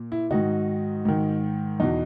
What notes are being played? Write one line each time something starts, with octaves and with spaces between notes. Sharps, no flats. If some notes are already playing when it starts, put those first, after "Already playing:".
Already playing: A#2
E4
G#2 D#3 D#4 F#4
G#2 D#3
E2 B2 D#4